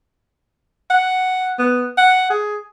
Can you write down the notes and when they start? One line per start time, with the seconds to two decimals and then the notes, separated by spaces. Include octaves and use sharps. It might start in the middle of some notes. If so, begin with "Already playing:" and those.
0.90 F#5
1.59 B3
1.98 F#5
2.30 G#4